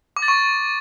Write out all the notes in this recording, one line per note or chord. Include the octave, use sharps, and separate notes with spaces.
D6
A6
C#6